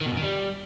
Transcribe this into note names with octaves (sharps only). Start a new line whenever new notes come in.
D#3
B2
F#2
D#3
G3